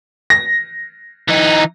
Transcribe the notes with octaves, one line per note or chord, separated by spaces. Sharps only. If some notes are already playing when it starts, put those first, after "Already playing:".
A#6
E3 D#4